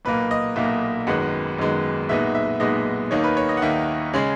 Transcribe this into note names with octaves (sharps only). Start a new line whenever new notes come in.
B1 A#2 A#3 B4
D#5
B1 A#2 A#3 E5
G#1 F#2 D#3 G#3 B3 F#5
G#1 F#2 D#3 G#3 B3
B1 A#2 G#3 B3 D#4 E5
E5
B1 A#2 G#3 B3 D#4 D#5
D#2 D#3 A#3 D#4 C#5
B4
C#5
D#5
F#5
D#2 D#3 A#3 D#4 E5
C#3 G#3 C#4 G#4